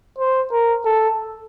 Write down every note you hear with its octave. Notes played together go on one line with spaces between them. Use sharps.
C5
A#4
A4